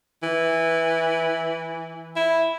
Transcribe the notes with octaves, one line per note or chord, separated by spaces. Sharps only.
E3
E4